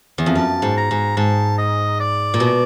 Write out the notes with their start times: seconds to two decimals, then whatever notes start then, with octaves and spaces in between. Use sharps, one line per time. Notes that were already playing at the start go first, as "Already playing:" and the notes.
0.18 E2
0.26 F2
0.35 F#2 A5
0.62 G#2
0.77 A#5
0.91 G#2
1.17 G#2 A5
1.58 D#5
2.00 D5
2.34 A#2
2.40 B2